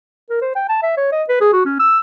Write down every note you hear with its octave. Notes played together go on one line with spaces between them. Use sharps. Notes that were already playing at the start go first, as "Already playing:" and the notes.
A#4
C5
G5
A5
E5
C#5
D#5
B4
G#4
F#4
C#4
E6